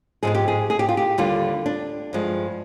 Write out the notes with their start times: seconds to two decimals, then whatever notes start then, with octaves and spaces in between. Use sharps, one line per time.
0.23 G#2 F3 G#3 G#4
0.35 G4
0.48 G#4
0.70 G#4
0.79 G4
0.89 F4
0.97 G4
1.18 D#2 D3 G3 F4
1.66 D4
2.13 G2 F3 G#3